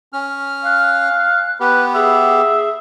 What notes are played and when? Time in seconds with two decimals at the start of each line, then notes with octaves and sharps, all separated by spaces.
0.13 C#4 F6
0.64 F5 F#6
1.60 B3 G4 B4 F#6
1.95 G#4 E5